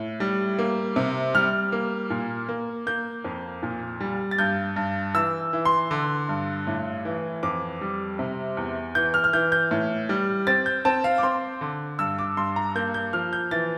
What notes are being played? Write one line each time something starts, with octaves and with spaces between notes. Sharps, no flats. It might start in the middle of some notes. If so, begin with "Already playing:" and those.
Already playing: A2
G3
A#3
C3
G3 F6
A#3
A#2
A#3
A#3 G6
F2
A#2
G3
A6
G2 G6
G2
E3 E6
E3
C6
D3
G2
A2
E3
F2 D6
G3
C3
E2
E3 G6
F6
F6
E3 G6
G6
A2
G3
C4 A6
G6
C4 A5
F5
D6
C4 C6
D3
G2 E6
D6
G2 C6
A#5
A#3 G6
G6
F3 F6
G6
E3 A6